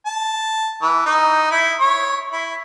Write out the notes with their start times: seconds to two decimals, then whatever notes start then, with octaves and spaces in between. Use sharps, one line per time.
0.06 A5
0.82 E3
1.06 D#4
1.51 E4
1.80 C#5
2.33 E4